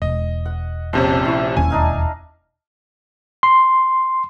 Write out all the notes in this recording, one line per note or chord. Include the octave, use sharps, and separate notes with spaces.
E1 D#5
F#5
A#1 C3 C#4 C5 A5
E4 C#6
E1 D#2 C#4 G#5
D4 D#4 F5
C6